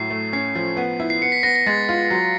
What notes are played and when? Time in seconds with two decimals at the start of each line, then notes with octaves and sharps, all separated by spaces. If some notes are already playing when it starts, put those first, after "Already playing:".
Already playing: A2 F#3 C7
0.10 A3
0.33 C#4 C7
0.55 F3
0.77 B3
1.00 E4
1.10 C7
1.22 B3 C#7
1.32 B6
1.43 B3 A#6
1.56 A#6
1.66 G#3 A6
1.89 F4
2.10 F#3